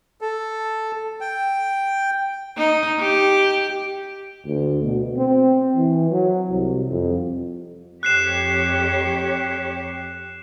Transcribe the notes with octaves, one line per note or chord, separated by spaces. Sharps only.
A4
G5
D#4
G4
D2
B2
C4
E3
F#3
C2
F2
F2 G4 C#5 F#6 C7 E7